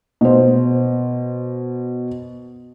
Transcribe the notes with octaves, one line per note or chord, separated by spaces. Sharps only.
B2 C5